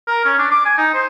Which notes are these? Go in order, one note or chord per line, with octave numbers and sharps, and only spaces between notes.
A#4
C#4
D4
D6
G#5
D#4
C5